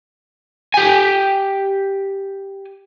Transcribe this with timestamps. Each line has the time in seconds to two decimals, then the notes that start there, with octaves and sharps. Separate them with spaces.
0.74 G4 G#5